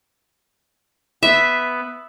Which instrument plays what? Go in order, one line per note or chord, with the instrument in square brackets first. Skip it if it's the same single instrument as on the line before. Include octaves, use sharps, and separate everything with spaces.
[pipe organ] B3 B4 [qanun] E5